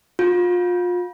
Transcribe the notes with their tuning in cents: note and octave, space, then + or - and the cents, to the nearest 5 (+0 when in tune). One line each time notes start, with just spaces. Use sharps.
F4 +30